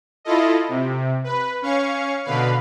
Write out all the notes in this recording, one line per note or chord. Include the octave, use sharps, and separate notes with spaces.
E4 F4 A4 D#5
C3
B4
C#4 F5 C#6
B2 D3 B4 F5